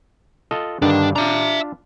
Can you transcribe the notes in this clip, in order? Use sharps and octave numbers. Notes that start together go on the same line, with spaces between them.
F4 A4 D#5
G2 D3 D#3 D4
D4 F4 E5 A#5